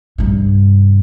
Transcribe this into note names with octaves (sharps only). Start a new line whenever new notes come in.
G2 C3